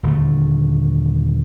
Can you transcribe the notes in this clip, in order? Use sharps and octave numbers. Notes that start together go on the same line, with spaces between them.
D#1 D3 A3